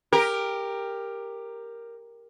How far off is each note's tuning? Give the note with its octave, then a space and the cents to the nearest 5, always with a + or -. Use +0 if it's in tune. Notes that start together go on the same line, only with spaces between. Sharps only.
G4 +15 A#4 +0